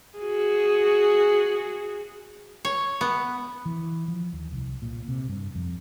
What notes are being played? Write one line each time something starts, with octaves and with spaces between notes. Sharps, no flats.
F#4 G#4
C#5
B3
E3
F3
D#2
C2
A#2
C3
G2
F2